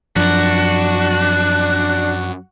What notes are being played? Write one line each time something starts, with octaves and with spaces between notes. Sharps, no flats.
F#2 F3 D4 F#4